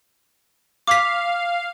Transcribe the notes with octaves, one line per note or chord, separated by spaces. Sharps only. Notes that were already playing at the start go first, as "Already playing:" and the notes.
F5 D6 B6